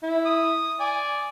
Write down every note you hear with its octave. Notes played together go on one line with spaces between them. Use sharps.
E4
D#6
D5 G#5